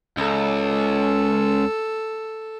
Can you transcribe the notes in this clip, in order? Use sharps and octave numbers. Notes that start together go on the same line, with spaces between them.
C#2 A4